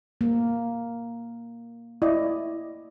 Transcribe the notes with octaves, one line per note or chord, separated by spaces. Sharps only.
A#3
E4 D5 D#5